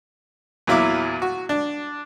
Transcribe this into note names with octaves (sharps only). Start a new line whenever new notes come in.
E2 A#2 F#3 E4 F5 D6
F#4
D4